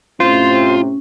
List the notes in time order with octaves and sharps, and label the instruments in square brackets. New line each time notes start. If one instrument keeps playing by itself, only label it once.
[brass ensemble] A2 C3 C4 [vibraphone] C#4 [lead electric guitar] F4 [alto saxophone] C5